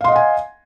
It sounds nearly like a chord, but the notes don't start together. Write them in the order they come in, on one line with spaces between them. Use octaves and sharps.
F5 C6 D#5 F#5 G#5